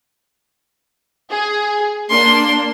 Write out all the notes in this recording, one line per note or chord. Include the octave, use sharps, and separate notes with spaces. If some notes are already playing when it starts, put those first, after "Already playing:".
G#4
A#3 D4 C6